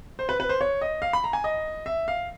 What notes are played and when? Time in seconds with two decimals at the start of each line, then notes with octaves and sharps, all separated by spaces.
0.19 C5
0.29 B4
0.40 B4
0.49 C5
0.61 C#5
0.82 D#5
1.02 F5
1.13 B5
1.24 A#5
1.33 G#5
1.44 D#5
1.86 E5
2.08 F5